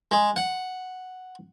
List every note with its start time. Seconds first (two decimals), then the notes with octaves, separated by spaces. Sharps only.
0.11 G#3
0.36 F#5